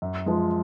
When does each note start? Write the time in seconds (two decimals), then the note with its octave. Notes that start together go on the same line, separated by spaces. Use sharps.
0.02 F#2
0.26 F3 G#3